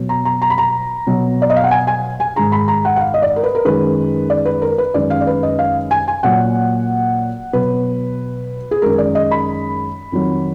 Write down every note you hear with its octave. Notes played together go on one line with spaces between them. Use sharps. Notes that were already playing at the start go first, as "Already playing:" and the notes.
Already playing: B2 F#3
A#5
A#5
A#5
B5
A#5
B2 F#3
D5
D#5
F5
F#5
G#5
G#5
G#5
G#2 D#3 G#3 A#5
B5
A#5
F#5
F#5
F5
D#5
D5
A#4
B4
A#4
F#2 D#3 G#3 B4
D5
B4
A#4
B4
F#2 D#3 G#3 D5
F5
D5
B4
D#5
F5
G#5
G#5
A#2 F#3 F#5
B2 F#3 B4
G#4
F#2 D#3 G#3 A#4
D5
D#5
B5
F2 D#3 F#3